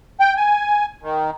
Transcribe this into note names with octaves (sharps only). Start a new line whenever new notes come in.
G5
G#5
D#3